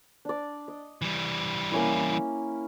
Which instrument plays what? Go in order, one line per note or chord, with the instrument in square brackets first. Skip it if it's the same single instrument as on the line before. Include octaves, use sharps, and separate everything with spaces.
[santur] D4 D5
D#5
[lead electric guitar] E3 G3
[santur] A#3 C#4 E4